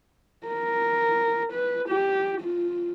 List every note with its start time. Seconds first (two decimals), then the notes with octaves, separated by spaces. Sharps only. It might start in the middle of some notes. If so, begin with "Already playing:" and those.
0.47 A#4
1.53 B4
1.89 G4
2.41 F4